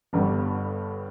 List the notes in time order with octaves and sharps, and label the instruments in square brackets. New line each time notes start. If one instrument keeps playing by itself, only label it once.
[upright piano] G1 G2 D3 G3 B3